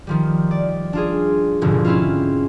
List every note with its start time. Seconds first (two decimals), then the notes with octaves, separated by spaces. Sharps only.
0.07 D#3 F3 G3
0.51 D5
0.93 D4 F4 G#4
1.61 F1 C2 G#2 B2 D3 F3
1.84 C4 C#4 E4 F4